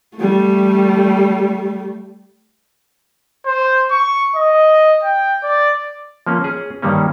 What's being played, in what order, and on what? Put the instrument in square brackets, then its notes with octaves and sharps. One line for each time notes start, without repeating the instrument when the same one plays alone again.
[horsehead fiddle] G3 A3
[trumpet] C5
C#6
D#5
G5
D5
[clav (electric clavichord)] F3 A#3 C#4
C#4 G#4
G2 D#3 G3 A#3 C#4